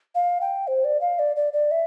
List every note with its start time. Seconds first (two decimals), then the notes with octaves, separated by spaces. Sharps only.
0.15 F5
0.41 G5
0.67 C5
0.84 D5
1.01 F5
1.19 D5
1.36 D5
1.53 D5
1.71 E5